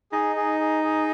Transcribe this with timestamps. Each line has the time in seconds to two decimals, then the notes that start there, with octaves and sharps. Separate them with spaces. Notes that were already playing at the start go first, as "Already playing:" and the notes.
0.12 D#4 G#4
0.36 G#4
0.60 G#4
0.84 G#4